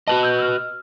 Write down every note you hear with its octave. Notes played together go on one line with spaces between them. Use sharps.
F#4 B4 D#5 A5
E6 G6
E6 F6